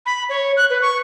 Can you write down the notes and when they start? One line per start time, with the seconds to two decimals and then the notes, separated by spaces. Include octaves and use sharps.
0.06 B5
0.29 C#5
0.57 F#6
0.70 B4
0.82 C#6